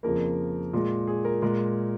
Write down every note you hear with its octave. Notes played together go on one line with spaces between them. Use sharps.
F2 C#3 F3 A#3 A#4
A#2 G#3
G#4
A#4
A#2 G#3 A#4